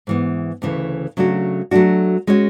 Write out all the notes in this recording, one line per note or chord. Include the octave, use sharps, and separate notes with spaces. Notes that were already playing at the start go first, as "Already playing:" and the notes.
G#2 E3 B3
D2 C#3 E3 A3
C#3 F#3 A3 D4 F#4
F#3 A3 D4 F#4
G#3 C#4 F#4 C#5